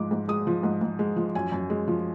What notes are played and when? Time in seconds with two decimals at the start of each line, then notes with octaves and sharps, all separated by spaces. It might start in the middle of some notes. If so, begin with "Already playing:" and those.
Already playing: G#2 F3 G#3 D6
0.11 G#2
0.28 G#3 D#6
0.47 F3
0.63 G#2
0.81 G#2
0.99 G#3
1.16 F3
1.35 F#2 G#5
1.52 F#2
1.70 G#3
1.88 F3